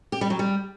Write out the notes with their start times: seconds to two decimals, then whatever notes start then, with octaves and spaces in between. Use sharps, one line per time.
0.12 G4
0.21 G3
0.30 F#3
0.39 G3